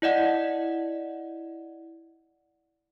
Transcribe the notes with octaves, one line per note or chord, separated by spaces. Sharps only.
E4 D5 D#5 F#5